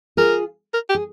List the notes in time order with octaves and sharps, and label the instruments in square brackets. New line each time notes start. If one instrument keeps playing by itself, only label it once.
[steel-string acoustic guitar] F4 G#4 [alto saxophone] A#4
[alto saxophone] A#4
G4
[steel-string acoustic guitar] G#4